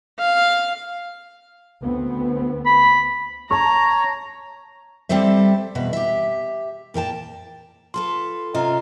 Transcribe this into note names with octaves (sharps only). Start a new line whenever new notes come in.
F5
D2 B3 C4
B5
C#5 A5 A#5 C#6
G3 C4 G4 A4 C5 E5
E2 B2 B4 E5
G4 E5
A#2 A#4 G5 A5
F4 A4 B4 C6
C3 C#4 F4 D#5 A#5